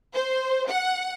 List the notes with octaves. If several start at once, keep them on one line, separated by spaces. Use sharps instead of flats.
C5
F#5